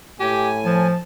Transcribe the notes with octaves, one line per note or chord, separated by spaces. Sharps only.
A2 G4 G#5
F3 A5